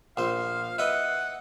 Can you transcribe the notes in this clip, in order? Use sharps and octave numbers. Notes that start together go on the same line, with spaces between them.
A#1 C5 F5
E4 B4 D#5 F#5